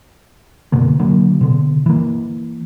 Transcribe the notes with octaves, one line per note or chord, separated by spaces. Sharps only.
F#1 B2 D3 A#3
D3 F#3 A#3
B2 D3
E3 A#3